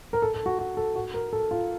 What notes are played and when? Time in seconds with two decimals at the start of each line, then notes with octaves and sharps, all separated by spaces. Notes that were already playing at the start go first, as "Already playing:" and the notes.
0.13 A#4
0.22 A4
0.34 A4
0.46 F#4
0.59 F#4
0.77 A4
0.96 F#4
1.14 A#4
1.33 A4
1.51 F4